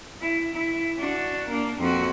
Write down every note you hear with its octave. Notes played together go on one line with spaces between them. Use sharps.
E4
E4
D4 F#4
A#3 D4
F2 F#4